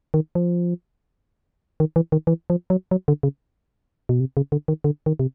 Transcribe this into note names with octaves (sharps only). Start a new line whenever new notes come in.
D#3
F3
D#3
E3
D#3
E3
F3
F#3
F#3
D3
C#3
B2
C3
C#3
D3
D#3
D3
D#3
C3